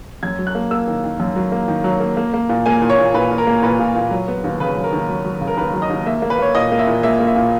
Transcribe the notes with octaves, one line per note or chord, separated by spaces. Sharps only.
F#2 G#6
F#3
F#6
A#3
A#3 E6
D#3
D#3
F#2
F#3
A#3
D#3
F#3
A#3
A#3
A#3
A#2
A#3 G#5
A#2
C#5
A#2
A#2 B4
A#2
A#4
A#3
A#2 B4
A#2
A#2
F#3
B3
D#2
C#3 B4
F#3
A#4
D#2
F#3
F#3
C#3
A#4
D#2 B4
F#3
D#5
D#2
A#3 E5
A#3
B4
A#3 C#5
A#2 D#5
A#3
E5
A#2
A#3 E5
A#3
E5
A#2